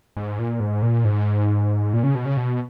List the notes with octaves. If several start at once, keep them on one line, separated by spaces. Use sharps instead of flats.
G#2
A#2
G#2
A#2
G#2
A#2
C#3
B2
C#3
B2